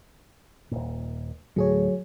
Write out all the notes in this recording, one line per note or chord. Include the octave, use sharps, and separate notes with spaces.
D#1 G#1 A#2
D2 A2 F#3 G#4 C#5